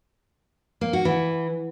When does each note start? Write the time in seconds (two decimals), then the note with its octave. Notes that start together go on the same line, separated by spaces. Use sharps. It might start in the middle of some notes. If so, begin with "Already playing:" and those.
0.81 A#3
0.93 F#4
1.05 E3